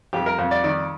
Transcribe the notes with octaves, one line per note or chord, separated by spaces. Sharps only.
F2 G4
A#4
F2
D5
D#3 D5